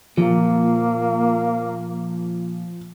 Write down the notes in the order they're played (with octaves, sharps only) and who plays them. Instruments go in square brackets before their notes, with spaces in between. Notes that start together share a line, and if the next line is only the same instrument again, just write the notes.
[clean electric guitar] A#2 [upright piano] F3 [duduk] A#3